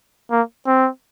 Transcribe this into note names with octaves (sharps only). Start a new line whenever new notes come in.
A#3
C4